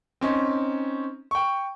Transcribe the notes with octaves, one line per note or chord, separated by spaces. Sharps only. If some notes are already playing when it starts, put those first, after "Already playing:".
C4 C#4 D#4
G5 C#6